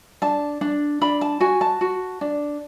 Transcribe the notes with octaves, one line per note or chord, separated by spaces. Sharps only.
D4 A5
D4
D4 B5
A5
F#4 G#5
A5
F#4
D4